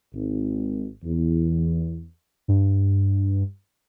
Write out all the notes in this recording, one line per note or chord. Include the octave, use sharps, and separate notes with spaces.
G#1
E2
G2